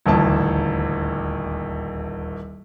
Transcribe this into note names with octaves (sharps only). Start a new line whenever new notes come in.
D#1 A1 D2 A5